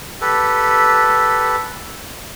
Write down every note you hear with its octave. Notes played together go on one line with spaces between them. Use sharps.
G4 A4 B4